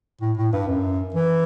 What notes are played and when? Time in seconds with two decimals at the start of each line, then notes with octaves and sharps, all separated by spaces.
0.21 A2
0.37 A2
0.53 G2
0.68 F#2
1.14 E3